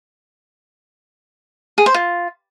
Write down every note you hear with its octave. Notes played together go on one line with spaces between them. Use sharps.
G#4
C5
F4